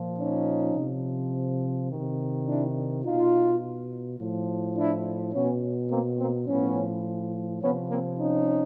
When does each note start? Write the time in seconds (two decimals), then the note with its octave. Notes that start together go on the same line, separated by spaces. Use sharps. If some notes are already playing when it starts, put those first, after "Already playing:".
Already playing: A#2 F3
0.17 C#4 D#4
0.75 C3
0.80 F3
1.90 C3 D#3
2.46 D4 E4
3.03 B2 D#4 F4
4.19 A2 F3
4.75 D4 E4
5.32 B2 B3 C#4
5.89 A#3 C4
6.18 A#3 C4
6.46 A2 F3 B3 C#4
7.61 C3 F3 B3 C#4
7.89 A#3 C4
8.18 C#4 D#4